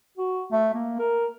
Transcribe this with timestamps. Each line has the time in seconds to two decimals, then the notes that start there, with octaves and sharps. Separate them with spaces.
0.17 F#4
0.52 A3
0.74 A#3
0.99 A#4